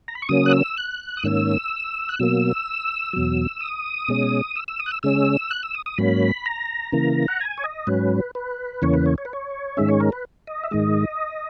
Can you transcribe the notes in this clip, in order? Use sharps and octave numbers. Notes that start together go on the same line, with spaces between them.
A#5
B5
C#6
C#3 F#3 A#3 C#4 D#6
F#6
E6
F#6
D#6
G#2 D#3 A#3 C#4 E6
F#6
B2 F#3 A#3 E6
E2 B2 F#3
D#6
B2 G#3 C#4
E6
E6
D#6
F#6
E6
C#3 G#3 C#4 E6
F#6
E6
D#6
D#6
G#2 F#3 A#3 C#4 B5
A#5
C#3 E3 A#3
F#5
G#5
C#5
D#5
G#2 F#3 C#4 B4
B4
E2 C#3 E3 A#3 C#4 C#5
B4
C#5
C#5
B4
C#5
G#2 D#3 G#3 C#4 E5
C#5
A#4
B4
D#5
E5
G#2 D#3 G#3 D#5